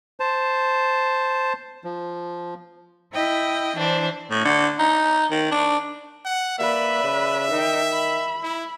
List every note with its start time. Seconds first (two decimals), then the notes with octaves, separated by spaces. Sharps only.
0.20 C5 A5
1.84 F3
3.13 E4 D#5 G5
3.76 E3 D4 C5
4.30 A2
4.45 D3
4.79 D#4
5.31 D#3
5.51 D4
6.25 F#5
6.59 A#3 B4 D5 E5
7.04 C#3
7.51 D#3 D#4 G5
7.92 B5
8.43 E4